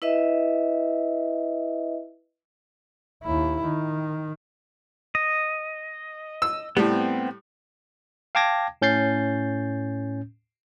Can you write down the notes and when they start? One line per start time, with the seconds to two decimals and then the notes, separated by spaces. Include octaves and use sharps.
0.02 E4 B4 D#5 E5
3.23 D#2 E4
3.64 D#3
5.15 D#5
6.42 E6
6.77 A2 G3 B3 C4
8.35 F5 G5 A5 D6 G#6 A#6
8.82 A2 C#4 G6 A6 C7